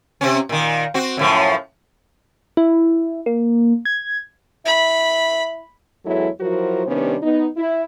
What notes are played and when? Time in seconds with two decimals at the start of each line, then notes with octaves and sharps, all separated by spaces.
0.21 C3 C4 C#4
0.49 A#2 D#3
0.94 C4 F#4
1.17 F#2 A2 F3
2.57 E4
3.26 A#3
3.85 G#6
4.65 E4 B5
6.05 E2 F#3 G#3 E4 A4 C#5
6.40 F3 F#3 E4 F#4 A#4 C5
6.87 C3 D#3 G3 B3 C#4 D4
7.22 B3 D#4
7.57 E4